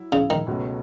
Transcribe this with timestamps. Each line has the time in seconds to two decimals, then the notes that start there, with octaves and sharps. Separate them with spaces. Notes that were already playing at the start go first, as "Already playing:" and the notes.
Already playing: F#3 E4
0.12 C#3
0.30 D#3
0.47 C#2 B2 F#3 A3 C#4